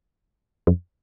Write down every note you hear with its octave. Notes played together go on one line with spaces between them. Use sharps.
F2